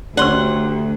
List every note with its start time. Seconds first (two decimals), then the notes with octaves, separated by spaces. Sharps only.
0.17 D2 C#4 D4 G4 F#5 C6